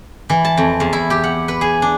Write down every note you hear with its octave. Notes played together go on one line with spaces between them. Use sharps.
E3
A5
F2
E2
E4
G4
F#5
B4
G#4
D4